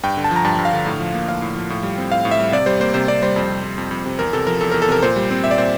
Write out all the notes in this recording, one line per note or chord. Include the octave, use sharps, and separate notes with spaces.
G2 G5
D3
A5
F3
A#5
G2 A5
G2
F5
D3
A2
F3
A#3
A2 F5
A2
F3
A2
G3
C4
A2 F5
A2
E5
G3
C3 D5
G3 C5
A#3 C5
C3 C5
C3 D5
G3 C5
F2
C3
G3
F2
F2
C3
E2 A#4
C3 A4
F3 A#4
E2 A4
E2 A#4
A4
C3 A#4
A#2 C5
G3
C4
A#2 E5
D5
A#2 C5